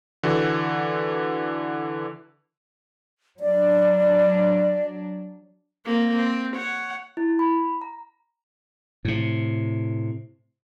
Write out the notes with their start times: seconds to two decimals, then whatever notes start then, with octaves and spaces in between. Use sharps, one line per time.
0.23 D3 E3 F#4
3.40 F#3 D4 D5
5.86 A#3 C4
6.16 C4
6.56 C#5 F#5
7.17 E4
7.39 B5
7.82 A#5
9.05 A2 C3